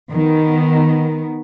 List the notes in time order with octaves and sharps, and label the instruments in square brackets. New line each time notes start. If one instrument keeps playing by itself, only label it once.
[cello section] D#3 B3